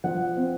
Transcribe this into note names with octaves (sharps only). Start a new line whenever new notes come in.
F3 F#5
C4